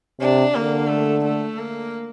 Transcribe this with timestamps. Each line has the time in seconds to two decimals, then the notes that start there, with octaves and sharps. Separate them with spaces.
0.21 C3 D4
0.55 D3 A#3
0.90 A3
1.25 A3
1.58 A#3